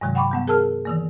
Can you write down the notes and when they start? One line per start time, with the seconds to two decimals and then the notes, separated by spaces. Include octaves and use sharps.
0.01 G2 C3 D#3 F#3 G#3
0.15 F#5 G5 B5 C#6 D6
0.31 G3 B3 F#5
0.47 G#4 A#4 A5 E6 F6
0.85 D#3 E3 A#3